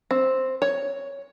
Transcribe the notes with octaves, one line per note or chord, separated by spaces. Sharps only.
C4
C#5